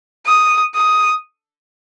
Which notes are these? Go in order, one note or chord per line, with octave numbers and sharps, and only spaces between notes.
D#6
D#6